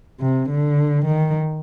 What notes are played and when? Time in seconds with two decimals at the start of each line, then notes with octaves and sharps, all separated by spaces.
0.21 C3
0.49 D3
1.05 D#3